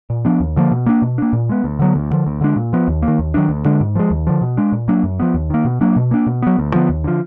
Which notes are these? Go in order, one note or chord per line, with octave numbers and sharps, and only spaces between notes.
A#2
F3 B3 D4
D#2
D3 F3 A#3
B2
A#3 D4
B2
A#3 D4
A#2
G#3 B3
D2
D3 F#3 B3
D2
D3 F3
D2
D3 G#3 D4
A#2
F3 B3
D#2
A#3
D#3
D#2
D#3 F#3 D4
D2
D3 G#3 D4
G#2
F3 G#3
D#2
D3 F3
B2
G#3 D4
A#2
F#3 A#3 D4
F#2
F3 B3
D#2
D#3 A#3
B2
F#3 A#3 D4
B2
A#3 D4
B2
F#3 B3
D2
D3 F3 B3
D#2
D3 F3